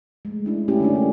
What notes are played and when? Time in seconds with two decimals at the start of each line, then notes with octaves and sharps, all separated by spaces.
0.25 G#3 A3
0.45 C#4 D4 E4
0.68 G#3 A3 C#4 E4 G4
0.80 D3 A#3 D4
0.95 F#4